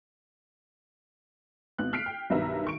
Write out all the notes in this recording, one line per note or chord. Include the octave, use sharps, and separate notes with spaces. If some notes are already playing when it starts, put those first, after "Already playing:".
G#1 B3 F#6
F6 B6 C7 D7
G5
B1 G2 D#3 B4 E5 A#5
D#3 C#6 D7